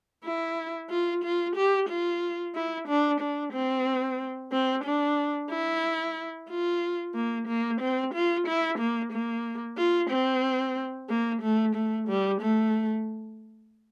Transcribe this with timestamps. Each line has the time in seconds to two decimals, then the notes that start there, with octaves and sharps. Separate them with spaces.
0.25 E4
0.90 F4
1.24 F4
1.56 G4
1.89 F4
2.55 E4
2.88 D4
3.20 D4
3.53 C4
4.52 C4
4.84 D4
5.50 E4
6.49 F4
7.15 A#3
7.47 A#3
7.81 C4
8.14 F4
8.47 E4
8.79 A#3
9.12 A#3
9.77 F4
10.10 C4
11.09 A#3
11.42 A3
11.76 A3
12.08 G3
12.41 A3